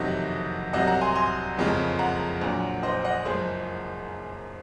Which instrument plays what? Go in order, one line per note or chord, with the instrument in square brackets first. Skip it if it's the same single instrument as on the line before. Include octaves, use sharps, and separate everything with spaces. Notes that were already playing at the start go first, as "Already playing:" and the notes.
Already playing: [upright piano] F#1 F2 C3 D#3 F#3 D#5 F#5
C2 C3 F#3 D#5 F#5
F#5 A#5
G#5 C6
G#5 C6
F#1 F2 C#3 F3 G#3
F#5 A#5
A#1 A#2 F#3
C5 D#5
D#5 F#5
F#1 F#2 F3 G#3 G#4 C5